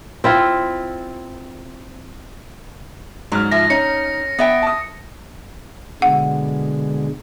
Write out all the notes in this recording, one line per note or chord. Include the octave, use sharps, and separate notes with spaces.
C4 E4 F4
G#2 F#3 F6
F3 E5 A#6
C#4 D#4 C#7
B3 E5 G5
A5 D#6
B2 D3 G#3 F#5